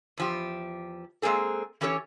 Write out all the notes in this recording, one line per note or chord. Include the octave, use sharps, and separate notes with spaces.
E2 F3 G4
G#3 A#3 C4 G#4 A4
E3 C#4 G4 A4 B4 C#5